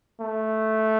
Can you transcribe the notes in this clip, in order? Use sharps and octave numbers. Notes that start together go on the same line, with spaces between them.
A3